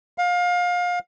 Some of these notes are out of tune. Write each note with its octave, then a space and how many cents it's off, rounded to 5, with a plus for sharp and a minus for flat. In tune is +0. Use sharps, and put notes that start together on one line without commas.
F5 +25